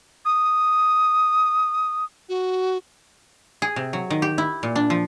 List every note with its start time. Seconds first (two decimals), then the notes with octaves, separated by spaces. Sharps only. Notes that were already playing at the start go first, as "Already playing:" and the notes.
0.25 D#6
2.29 F#4
3.62 G#4
3.76 C3
3.93 F#3
4.10 D#3
4.22 G4
4.38 E4
4.63 A#2
4.76 D4
4.90 F3